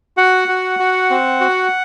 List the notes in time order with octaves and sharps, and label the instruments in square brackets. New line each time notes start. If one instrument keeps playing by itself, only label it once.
[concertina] F#4 F#5
F#4
F#4
C4
F#4